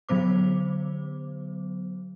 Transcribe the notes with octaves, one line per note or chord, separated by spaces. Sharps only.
D3 F#3 B3 C5 D6